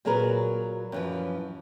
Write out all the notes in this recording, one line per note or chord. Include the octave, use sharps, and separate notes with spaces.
A#2 F#3 G#4 A#4 B4
F#2 E3 F3